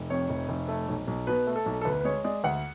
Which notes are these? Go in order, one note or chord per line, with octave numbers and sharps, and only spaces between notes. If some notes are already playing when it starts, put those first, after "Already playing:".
Already playing: F1
F2 C#5
F1
F1
A3
B1
B1
B2 B4
A3
A4
B1
A4
D2 B4
B4
G#3 C#5
G#3 D5
D2 F#5